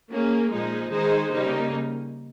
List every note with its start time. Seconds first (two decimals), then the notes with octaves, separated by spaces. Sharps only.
0.11 A#3 C#4 G#4
0.52 A#2 F3 G#3 D#4 G#4
0.92 D#3 G#3 D#4 G#4 C5
1.32 C#3 G3 A#3 D#4